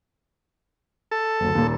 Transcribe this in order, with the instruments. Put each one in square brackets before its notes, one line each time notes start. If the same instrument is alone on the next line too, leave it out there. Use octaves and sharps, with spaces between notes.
[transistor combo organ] A4
[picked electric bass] F#1 D2
D#2 A#2